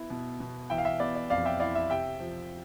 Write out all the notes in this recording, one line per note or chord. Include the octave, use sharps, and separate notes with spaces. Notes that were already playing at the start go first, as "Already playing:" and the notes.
Already playing: B3 E4
B2
B2
E3 E5 G5
F5
E5
B3 D5
D5
F2 D5 F5
E5 G5
E4 D5 F5
E5
C3 E5 G5
F3